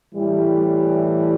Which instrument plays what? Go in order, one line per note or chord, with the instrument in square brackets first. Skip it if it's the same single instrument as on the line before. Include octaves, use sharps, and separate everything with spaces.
[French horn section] A2 E3 G3